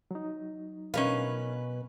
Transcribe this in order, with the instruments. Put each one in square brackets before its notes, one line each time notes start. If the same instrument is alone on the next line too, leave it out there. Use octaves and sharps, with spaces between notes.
[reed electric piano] F#3 D#4
[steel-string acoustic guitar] B2 B4 [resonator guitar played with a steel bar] C#4 A#4 F5